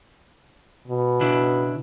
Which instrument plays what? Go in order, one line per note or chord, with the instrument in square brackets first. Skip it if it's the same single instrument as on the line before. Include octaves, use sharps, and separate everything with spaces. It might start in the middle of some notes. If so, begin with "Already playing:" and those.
[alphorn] B2
[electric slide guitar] C#3 D4 E4